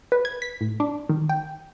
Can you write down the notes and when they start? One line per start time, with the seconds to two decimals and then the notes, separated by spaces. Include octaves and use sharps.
0.12 B4
0.25 G#6
0.42 B6
0.61 A2
0.80 D4
1.09 D#3
1.29 G5